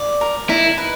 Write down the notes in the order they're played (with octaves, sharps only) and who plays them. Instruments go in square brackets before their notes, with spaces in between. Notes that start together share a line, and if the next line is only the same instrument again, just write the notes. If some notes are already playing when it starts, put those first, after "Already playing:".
Already playing: [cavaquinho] D5
A#4
[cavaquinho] D#4 [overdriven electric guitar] E4
[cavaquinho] B4